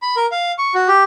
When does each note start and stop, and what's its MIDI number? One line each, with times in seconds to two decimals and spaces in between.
0.02 0.16 83
0.17 0.26 70
0.32 0.52 77
0.58 0.74 85
0.75 0.88 66
0.88 1.03 67